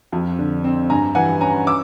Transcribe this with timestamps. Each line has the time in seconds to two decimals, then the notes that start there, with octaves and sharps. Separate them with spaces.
0.12 F2
0.39 D3
0.64 C4
0.90 G2 G#5 A#5
1.15 E3 F#5 G#5
1.41 C#4 G#5 A#5
1.67 D6 E6